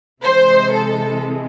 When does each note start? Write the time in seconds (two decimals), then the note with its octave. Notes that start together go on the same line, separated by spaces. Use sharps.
0.22 C3 E3 G#3 C5
0.73 A4